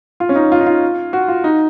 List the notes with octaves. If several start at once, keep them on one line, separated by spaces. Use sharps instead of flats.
F4
C#4
D#4
F4
D#4
F4
F#4
F4
D#4